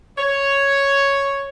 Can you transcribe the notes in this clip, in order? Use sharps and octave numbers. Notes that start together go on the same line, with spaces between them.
C#5